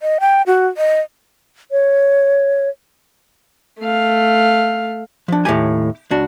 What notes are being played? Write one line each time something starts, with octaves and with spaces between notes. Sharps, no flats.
D#5
G5
F#4
D#5
C#5
A3 F5
F3 D4
D#2 A2 F3 G4 G#5
C#2 D4 F#4